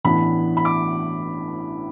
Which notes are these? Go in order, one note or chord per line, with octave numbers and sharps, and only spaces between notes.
A1 A2 E3 B3 D4 B5
B5
D6